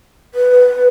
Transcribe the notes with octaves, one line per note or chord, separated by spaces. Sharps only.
B4